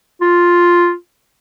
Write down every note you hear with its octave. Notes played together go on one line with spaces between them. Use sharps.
F4